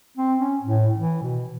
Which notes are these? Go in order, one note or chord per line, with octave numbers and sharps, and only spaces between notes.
C4
C#4
A2
E3
B2